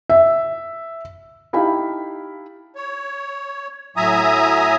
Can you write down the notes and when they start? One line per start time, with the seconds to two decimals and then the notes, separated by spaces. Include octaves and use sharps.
0.10 E5
1.53 D#4 E4 G4 F5 A5 B5
2.76 C#5
3.97 A2 F#3 E5 G#5 A#5 D#6